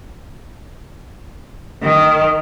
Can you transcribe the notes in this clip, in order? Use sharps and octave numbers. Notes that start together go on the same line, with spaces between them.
D#3